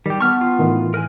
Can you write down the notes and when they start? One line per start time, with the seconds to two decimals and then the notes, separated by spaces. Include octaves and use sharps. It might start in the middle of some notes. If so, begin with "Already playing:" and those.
0.06 D#3 G3 G4
0.20 B3 A5 C#6 F6
0.41 F4
0.59 A2 D#3 E3
0.94 A#4 B4 G#5